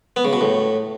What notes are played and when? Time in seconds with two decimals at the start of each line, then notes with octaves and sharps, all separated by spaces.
0.16 B3
0.25 C#3
0.33 B2
0.41 A2